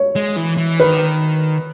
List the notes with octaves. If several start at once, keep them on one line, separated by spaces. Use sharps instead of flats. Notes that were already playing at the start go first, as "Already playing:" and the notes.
Already playing: C#5
G#3
E3
E3
D#3 B4